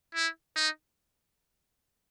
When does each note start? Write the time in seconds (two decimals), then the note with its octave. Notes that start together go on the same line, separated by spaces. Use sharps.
0.14 E4
0.56 D#4